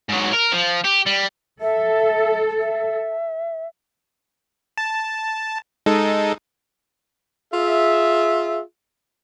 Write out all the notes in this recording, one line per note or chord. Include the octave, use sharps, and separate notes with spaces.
G#2 F#3
A#4
F3
G4
G3
A4 E5
E5
A5
G#3 D#4 A4
F4 G#4 E5